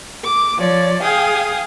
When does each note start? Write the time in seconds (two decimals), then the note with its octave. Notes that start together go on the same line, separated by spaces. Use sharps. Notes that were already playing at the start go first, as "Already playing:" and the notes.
0.23 D6
0.58 F3 C#5 D5
1.01 G#4 F5 G5 G#5 D#6